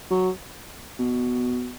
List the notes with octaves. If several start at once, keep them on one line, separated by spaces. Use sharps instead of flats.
F#3
B2